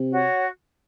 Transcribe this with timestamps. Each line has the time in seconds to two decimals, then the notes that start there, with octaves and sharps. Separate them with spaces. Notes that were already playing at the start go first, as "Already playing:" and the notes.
Already playing: C3
0.11 F#4 C#5 F#5